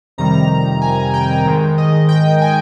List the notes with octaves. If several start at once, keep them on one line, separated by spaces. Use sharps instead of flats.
F2 C3 D#3 G3 A#5
G#5
G5
G#2 D#3 G#3
D#5
G5
G#5